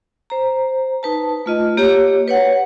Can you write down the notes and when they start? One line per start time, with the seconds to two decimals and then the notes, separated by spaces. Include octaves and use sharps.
0.30 C5 A#5
1.03 D#4 B4 A5
1.46 A3 F4 D#5
1.77 A#3 G4 C#5
2.28 B4 C#5 F#5